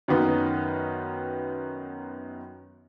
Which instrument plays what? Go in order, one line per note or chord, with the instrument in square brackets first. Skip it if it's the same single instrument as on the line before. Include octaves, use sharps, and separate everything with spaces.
[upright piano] F#2 D#3 B3 D#4